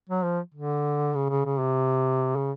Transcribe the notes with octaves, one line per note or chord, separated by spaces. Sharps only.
F#3
F3
D3
C#3
C#3
C#3
C3
C#3